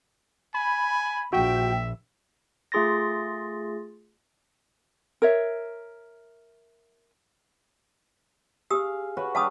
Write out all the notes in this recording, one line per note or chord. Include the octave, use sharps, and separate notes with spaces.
G#5 B5
A#1 F#4 E5 G5
A3 F4 G#4 C6 A6 A#6
A#4 C#5 E5
G4 G#4 F5 D#6 E6
F#4 B4 C#5
G3 D4 F5 A5 D#6